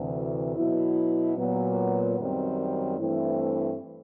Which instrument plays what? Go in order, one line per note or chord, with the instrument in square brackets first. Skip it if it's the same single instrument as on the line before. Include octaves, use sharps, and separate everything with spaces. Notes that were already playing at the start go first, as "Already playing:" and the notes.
Already playing: [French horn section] D2 C3 E3
B2 F#3 B3 E4
A#2 F#3 B3
F#2 D#3 G3 C4
G2 E3 A3 C4 E4